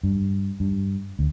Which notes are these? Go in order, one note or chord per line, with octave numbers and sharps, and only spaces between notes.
G2
G2
D2